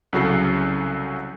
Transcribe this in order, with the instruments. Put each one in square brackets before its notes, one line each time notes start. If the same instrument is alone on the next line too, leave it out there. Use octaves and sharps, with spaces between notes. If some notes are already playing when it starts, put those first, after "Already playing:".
[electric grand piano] C2 C#3 F#3 F#4 A4 C7